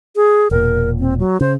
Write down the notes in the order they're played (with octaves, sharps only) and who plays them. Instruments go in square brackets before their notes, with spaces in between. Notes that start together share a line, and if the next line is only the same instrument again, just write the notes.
[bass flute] G#4
[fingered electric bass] E1 A#2 [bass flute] A#4
[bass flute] C4
F#3
[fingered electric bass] C#3 [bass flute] C5